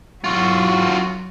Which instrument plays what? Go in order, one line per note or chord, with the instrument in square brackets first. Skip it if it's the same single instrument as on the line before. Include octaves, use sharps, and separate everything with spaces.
[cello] F#3 [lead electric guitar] F4 F#4